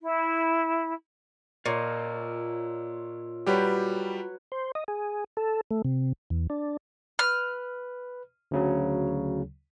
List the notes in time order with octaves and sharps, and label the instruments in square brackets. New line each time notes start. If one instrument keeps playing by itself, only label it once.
[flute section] E4
[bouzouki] A#2 [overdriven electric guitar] F4 D#5 [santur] C#5
[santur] F#3 B4 C#5 [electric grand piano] G3 G4
[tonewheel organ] C5
D#5
G#4
A4
A3
C3
E2
D4
[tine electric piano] B4 [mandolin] F6
[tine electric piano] D2 C#3 F#3